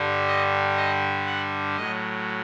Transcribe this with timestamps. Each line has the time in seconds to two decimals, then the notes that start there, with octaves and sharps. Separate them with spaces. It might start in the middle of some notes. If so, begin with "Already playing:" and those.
Already playing: G2 D3 G3
0.27 D#5
0.76 D#5
1.26 F#5
1.76 A2 F#3 D#5